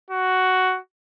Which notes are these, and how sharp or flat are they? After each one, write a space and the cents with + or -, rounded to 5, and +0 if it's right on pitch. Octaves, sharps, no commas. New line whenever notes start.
F#4 +5